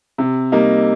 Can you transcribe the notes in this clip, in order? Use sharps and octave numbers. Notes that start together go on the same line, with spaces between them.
C3
G3 A#3 D#4